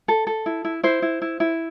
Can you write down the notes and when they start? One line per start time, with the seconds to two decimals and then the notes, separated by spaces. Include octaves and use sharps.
0.08 A4
0.27 A4
0.46 E4
0.65 E4
0.83 E4 C5
1.02 E4
1.22 E4
1.40 E4